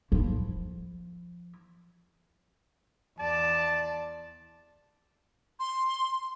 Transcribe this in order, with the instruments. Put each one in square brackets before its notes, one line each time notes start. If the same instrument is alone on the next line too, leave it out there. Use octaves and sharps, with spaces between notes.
[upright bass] F3 E4
[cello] E2 D5 [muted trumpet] A5
[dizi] C6